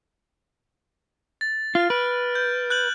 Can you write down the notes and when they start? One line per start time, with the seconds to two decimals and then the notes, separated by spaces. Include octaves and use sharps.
1.41 A6
1.75 F4 F6
1.90 B4 D7
2.35 G6
2.70 F#6 G6 F#7